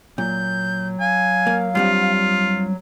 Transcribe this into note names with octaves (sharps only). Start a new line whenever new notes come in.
A#2 F#3 G6
F5 G#5
A#3
G2 G3 C4 F4